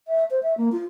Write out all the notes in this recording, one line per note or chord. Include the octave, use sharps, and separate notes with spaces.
E5
C5
E5
A#3
F4